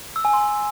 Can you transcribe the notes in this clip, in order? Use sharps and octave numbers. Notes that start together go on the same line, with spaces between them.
E6
G#5
C6